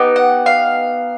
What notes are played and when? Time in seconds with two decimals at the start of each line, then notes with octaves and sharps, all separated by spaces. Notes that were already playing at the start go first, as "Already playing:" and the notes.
Already playing: B3 D#4 G4
0.16 F#5
0.46 F5